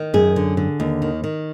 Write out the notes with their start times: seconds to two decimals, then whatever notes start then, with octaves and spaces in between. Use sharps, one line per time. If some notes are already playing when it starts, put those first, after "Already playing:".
Already playing: D#3
0.14 F#2 G#4
0.36 D3
0.57 D3
0.80 D#2
1.02 D#3
1.24 D#3